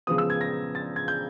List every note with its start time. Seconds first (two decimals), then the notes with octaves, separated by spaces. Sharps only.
0.07 C#3 F3 G#3 B3 D#6
0.18 E6
0.30 G#6
0.41 A#6
0.75 A6
0.96 G#6
1.08 G6